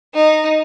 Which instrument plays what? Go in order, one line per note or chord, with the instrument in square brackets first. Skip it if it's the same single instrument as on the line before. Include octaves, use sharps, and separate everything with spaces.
[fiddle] D#4